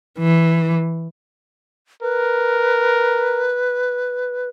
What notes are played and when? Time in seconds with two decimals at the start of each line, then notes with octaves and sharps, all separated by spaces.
0.19 E3
2.02 A#4 B4